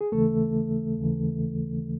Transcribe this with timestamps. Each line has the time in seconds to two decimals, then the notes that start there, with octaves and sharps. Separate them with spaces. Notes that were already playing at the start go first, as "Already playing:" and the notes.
0.01 G#4
0.12 D#2 C#3 E3 A3 A4
0.98 D#2 C#3 E3